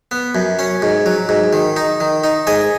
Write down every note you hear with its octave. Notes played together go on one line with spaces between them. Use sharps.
B3
F#2
C#4
G#2
F#3
G#2
D#3
D#4
D#3
D#4
G#2 D#5 G#5